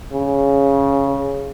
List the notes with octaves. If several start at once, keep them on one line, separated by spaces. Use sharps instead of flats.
C#3